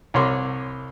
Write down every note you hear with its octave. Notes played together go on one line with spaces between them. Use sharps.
C2 C#5 C6 D6